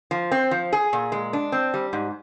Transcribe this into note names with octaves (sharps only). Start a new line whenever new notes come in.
F3
C4
F3
G#4
A#2
G#3
D4
C4
G3
G#2